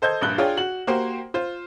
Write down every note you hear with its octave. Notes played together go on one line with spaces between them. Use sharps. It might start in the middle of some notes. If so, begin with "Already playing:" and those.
A4 C5 D#5 G6 G#6
A#1 G2 F#6 G7
D4 F4 G#4 C#5 D5 G5
F#4 F#7
A#3 F#4 G4 C5 C6
F4 C5